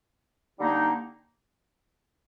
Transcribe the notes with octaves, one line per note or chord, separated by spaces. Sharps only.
D3 G3 A#3 D#4